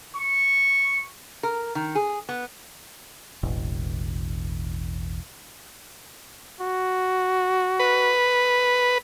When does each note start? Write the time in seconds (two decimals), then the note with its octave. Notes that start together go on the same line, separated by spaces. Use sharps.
0.17 C#6
1.43 A#4
1.75 D#3
1.95 G#4
2.29 B3
3.43 E1 A1
6.61 F#4
7.79 B4